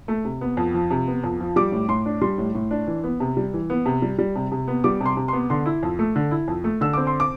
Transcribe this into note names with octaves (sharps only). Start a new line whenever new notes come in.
A3
C3
B3
F2
F3
C3
B3
F2
F3
G3 D6
A2
A2 C6
D4
G3 C6
A2
A2
D4
E3
B3
C3
G3
E3
B3
C3
G3
G3
C3
C3
B3
G3 D6
C3 C6
C3
C6
B3
D3 C6
E4
F2
A3
D3
E4
F2
A3
D3 E6
C4 D6
C6
D6